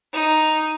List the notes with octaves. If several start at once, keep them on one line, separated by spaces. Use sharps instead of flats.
D#4